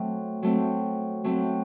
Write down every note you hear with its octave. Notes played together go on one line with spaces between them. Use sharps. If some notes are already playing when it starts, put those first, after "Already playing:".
Already playing: F#3 A3 C4
F#3 A3 C4
F#3 A3 C4